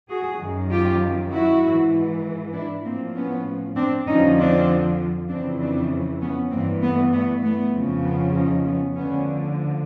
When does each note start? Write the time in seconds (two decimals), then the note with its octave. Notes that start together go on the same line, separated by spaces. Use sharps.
0.09 F#4 G#4
0.39 F#2 D#3
0.70 F4 G4
1.31 E4 F#4
1.63 G#2 E3
2.53 D4 E4
2.84 A2 F3 A#3 C4
3.14 B3 C#4
3.75 C4 D4
4.07 F2 D3 F3 C#4 D#4
4.38 C4 D4
5.29 F2 C#3 E3 C4 D4
5.60 C4 D4
6.21 B3 C#4
6.51 G2 E3 A#3 C4
6.82 A3 B3
7.13 A3 B3
7.42 A3 B3
7.73 F2 C#3 F3
8.04 B3 C#4
8.35 C#4 D#4
8.65 B3 C#4
8.95 D2 D3 F3 B3 C#4